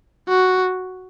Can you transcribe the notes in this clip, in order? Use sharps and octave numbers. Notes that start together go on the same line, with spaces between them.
F#4